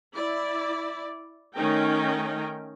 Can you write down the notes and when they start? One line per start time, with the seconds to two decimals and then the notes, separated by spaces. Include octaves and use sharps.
0.14 E4 D5
1.55 D#3 A3 C#4 D#4 A#4 G5